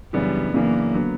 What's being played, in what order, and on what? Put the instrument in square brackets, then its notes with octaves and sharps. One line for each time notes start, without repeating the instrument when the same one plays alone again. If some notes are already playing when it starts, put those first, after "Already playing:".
[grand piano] F#2 C#3 E3 B3 D4 [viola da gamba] G3
[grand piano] F#2 C#3 E3 B3 D4 [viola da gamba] A#3
[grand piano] D3 F#3 B3